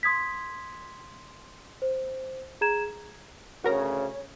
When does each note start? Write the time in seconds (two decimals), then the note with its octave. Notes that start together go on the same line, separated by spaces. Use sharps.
0.03 C6 D#6 G#6 B6
1.82 C5
2.61 G#4 A#5 G#6 E7
3.64 D2 C#3 F#4 A#4 C#5 A#5